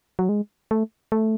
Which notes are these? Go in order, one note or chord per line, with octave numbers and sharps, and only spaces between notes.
F#3
G#3
A3
A3